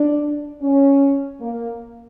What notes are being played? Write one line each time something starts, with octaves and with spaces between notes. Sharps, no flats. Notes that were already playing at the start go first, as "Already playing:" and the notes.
Already playing: D4
C#4
A#3